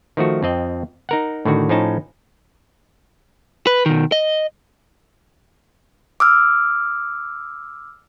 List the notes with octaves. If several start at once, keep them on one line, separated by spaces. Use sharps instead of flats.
D#3 F3 A3 F#4
F2 C4 D#5
D#4 A#4 F#5
A2 D3 D#3 F#4
A2 F3 C#4 D#4 A5
B4
B2 D#3
D#5
D6 E6 F6